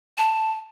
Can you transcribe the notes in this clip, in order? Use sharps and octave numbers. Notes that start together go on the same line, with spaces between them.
A5